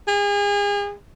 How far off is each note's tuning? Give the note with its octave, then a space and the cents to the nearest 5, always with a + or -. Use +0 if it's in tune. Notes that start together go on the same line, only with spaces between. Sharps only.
G#4 -35